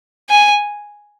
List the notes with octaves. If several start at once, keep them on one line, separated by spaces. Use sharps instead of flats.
G#5